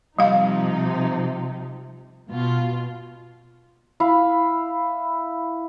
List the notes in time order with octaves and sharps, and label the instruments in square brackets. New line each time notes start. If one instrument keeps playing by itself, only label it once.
[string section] C3 F3 D#4 [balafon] G3 F5
[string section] B2 F4
[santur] E4 F5 B5